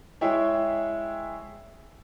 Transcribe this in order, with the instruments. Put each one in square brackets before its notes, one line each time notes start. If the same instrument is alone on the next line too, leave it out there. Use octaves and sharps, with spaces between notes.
[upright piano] G#3 E4 G#4 C#5 E5 G5